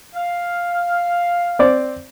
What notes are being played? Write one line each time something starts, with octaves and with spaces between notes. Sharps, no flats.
F5
C4 D5